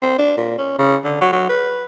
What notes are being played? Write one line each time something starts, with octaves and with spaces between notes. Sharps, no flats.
C4
D4
A#2
C#4
C#3
D3
F#3
F#3
B4